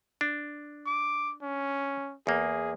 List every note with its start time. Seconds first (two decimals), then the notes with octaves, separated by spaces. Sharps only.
0.21 D4
0.86 D6
1.42 C#4
2.27 E2 A#3 G#4